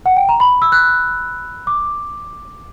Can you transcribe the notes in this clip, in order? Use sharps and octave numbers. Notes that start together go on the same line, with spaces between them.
F#5
G5
A#5
B5
E6
F#6
D6